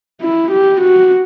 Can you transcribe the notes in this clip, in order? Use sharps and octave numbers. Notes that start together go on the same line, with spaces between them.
E4
G4
F#4